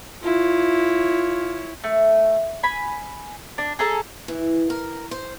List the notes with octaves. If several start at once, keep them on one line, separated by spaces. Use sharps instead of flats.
E4 F4 C#5
A3
G#5 B5
D4
G#4 A4 A#5
E3
A#4
C5